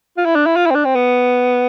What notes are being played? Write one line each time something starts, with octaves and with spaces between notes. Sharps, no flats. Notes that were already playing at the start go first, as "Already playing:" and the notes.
F4
E4
D4
E4
F4
E4
C4
D4
C4
B3